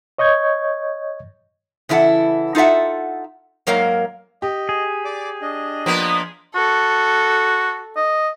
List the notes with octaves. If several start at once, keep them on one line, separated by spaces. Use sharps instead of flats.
C#5 D#5 C#6 G6 G#6
C#3 E3 E4 A4 F#5
D#4 F4 A4 E5 F#5
G#2 F#3 A#3 A#4 C#5 F5
G4 D#5
G#4
D5 D6
D4 D#5
F3 A#3 B3
F#4 A4
D#5